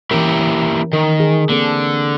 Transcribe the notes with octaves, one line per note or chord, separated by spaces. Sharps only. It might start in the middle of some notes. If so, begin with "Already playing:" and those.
E3 A#3 C#4 E4 G4 A#4
D#3 A#4
G#4
D3 A#3 C4 A4